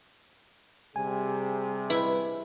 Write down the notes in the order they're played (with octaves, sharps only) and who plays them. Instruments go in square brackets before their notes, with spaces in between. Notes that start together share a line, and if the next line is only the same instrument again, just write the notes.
[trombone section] C3 G3 G#4 [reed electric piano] G#5
[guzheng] E4 [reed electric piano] B4